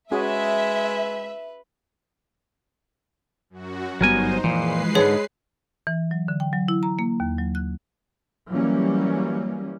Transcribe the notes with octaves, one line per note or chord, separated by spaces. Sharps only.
G#3 C#4 F#4 G#4 B4 E5
F#2 F#4
G1 F#3 G3 B3 D#4 A#4 C5 G#5
A#2 E3 F3 G#3 B4 C7
G#2 D3 G#4 C#5
E3
F#3
D3
G5
F#3
E4
A#5
A#3
D#2
F#3
F#6
E3 F#3 G3 A#3 C#4